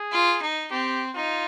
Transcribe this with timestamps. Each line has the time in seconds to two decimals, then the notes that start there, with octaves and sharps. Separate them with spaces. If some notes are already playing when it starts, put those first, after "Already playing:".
Already playing: G#4
0.12 F4
0.42 D#4
0.71 C4 G4
1.15 D#4 F4